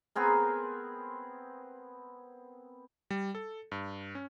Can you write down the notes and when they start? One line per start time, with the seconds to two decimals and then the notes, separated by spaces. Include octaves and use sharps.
0.16 B3 C4 G#4 A#4
3.11 G3
3.35 A4
3.72 G2
4.15 C#4